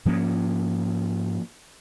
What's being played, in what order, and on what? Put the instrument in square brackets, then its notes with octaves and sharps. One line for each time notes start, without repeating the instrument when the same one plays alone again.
[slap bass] G#2 F3 A#3 C#4